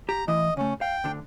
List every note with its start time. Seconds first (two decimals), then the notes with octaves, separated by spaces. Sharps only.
0.09 G4 A#5
0.28 A2 E3 E4 D#5
0.57 C#3 A3 C#4
0.81 F5 G5
1.04 D2 D3 D4